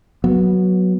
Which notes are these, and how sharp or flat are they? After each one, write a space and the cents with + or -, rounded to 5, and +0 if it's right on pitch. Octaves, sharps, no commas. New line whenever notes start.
F#3 +0 B3 -20